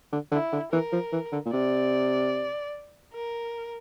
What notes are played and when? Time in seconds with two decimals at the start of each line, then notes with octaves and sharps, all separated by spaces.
0.13 D3
0.32 D3 E4
0.53 D3
0.72 E3 A#4
0.93 F3
1.13 E3
1.32 D3
1.46 A#2
1.53 C3 D5
3.14 A#4